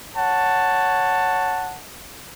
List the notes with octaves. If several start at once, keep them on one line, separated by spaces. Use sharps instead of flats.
C#5 F#5 A5